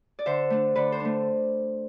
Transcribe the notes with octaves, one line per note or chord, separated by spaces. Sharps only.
D5
D3 C5 E5
A3 D4
D3 B4 D5
A4 C5
D4
A3